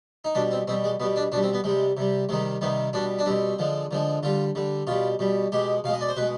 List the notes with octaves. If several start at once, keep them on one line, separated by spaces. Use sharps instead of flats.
D#4
B2 G3 D4
C4
B2 G3 C4
G#3
B2 G3 B3
D4
B2 G3 D4
C4
B3
C3 G3 G#3
C3 G3
C3 D#3 G3 G#3
C3 D#3 G3 B3
B2 G3 D4
D4
B2 G3 C4
D3 F3 G#3
D3 F3 G#3
D3 G3 F4
D3 G3
B2 G3 F4
B2 G3
B2 G#3 G4
B2 G#3 F5
D#5
D5
C5
B2 G#3 B4